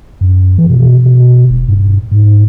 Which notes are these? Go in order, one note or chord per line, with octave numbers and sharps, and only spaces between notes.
F#2
E3
B2
B2
D#1
G2
G#2